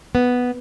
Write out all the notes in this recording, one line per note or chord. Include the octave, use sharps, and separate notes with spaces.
B3